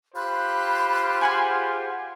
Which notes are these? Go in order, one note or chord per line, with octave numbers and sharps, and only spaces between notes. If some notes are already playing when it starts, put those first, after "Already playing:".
F4 G4 C5 B5 F#6
G#4 F#5 G#5